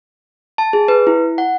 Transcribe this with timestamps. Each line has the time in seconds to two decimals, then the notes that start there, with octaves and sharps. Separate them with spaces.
0.58 A5
0.73 G#4
0.88 B4
1.07 E4
1.38 F#5